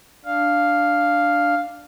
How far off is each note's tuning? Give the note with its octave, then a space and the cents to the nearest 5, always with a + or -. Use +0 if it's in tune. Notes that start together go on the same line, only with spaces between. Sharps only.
D4 +0 F5 +0